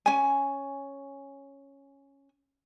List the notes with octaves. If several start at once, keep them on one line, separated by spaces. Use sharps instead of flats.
C#4 G#5